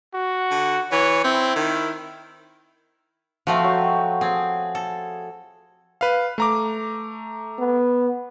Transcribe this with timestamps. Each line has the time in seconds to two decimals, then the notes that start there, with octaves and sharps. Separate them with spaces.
0.14 F#4
0.51 D3
0.92 E3 C#5
1.24 C4 E4
1.56 D#3
3.47 F3 A3 C4 F#4
3.64 F#3 G5 C#6
4.21 C4 G#4
4.75 A4
6.01 B4 F5
6.38 A3 A#5 D6
7.59 B3